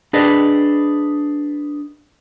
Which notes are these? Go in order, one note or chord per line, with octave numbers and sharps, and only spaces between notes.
D4 G#4 B4 D5 D#5